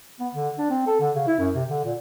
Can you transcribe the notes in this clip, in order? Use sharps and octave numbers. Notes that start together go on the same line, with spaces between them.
B3
D3
D4
C4
A4
D3
C#3
E4
F#2
C3
D3
A#2